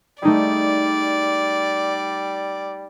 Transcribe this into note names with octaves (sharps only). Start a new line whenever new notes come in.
G3 A3 D#4 G#4 D5